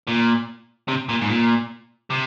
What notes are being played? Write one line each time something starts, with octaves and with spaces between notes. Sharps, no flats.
A#2
C3
A#2
G#2
A#2
C3